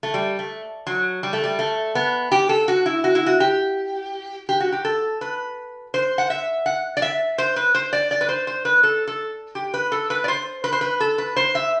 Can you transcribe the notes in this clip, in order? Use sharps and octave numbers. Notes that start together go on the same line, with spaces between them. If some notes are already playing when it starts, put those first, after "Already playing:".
A3
G3
A3
F#3
G3
A3
G3
A3
B3
G4
A4
F#4
E4
F#4
E4
F#4
G4
G4
F#4
G4
A4
B4
C5
F#5
E5
F#5
D5
E5
C5
B4
C5
D5
D5
B4
C5
C5
B4
A4
A4
G4
B4
A4
B4
D5
C5
B4
C5
B4
A4
B4
C5
E5